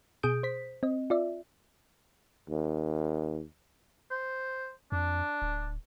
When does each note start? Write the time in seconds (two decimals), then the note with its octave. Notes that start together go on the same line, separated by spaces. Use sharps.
0.23 B2 G#4 D#6 G6 D7
0.43 C5 B6
0.83 C4 D#5
1.10 F4 D5 E5
2.49 D#2
4.11 C5
4.92 F2 D4
5.42 D1